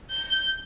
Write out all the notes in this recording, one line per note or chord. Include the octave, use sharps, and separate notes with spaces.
G6